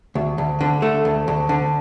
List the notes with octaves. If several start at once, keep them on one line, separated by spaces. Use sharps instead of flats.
D2
D2
D3
A3
D2
D2
D3